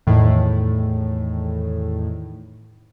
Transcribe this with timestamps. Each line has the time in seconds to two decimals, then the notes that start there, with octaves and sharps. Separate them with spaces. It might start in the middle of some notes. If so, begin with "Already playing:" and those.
0.07 E2 A2 D#3